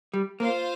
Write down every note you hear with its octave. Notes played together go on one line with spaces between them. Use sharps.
G3
A#3 F4 C5 F5